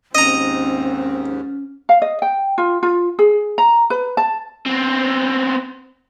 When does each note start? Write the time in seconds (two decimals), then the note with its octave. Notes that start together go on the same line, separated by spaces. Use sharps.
0.15 D#2 G#2 C4 C#4 D#5 A#5
1.89 F5
2.02 D#5
2.22 G5
2.58 F4
2.83 F4
3.19 G#4
3.58 A#5
3.90 B4
4.17 A5
4.66 B3 C4